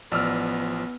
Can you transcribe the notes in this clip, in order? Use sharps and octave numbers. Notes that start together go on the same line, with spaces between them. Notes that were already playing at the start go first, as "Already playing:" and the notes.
A1 F3 B3 D5 E6 F6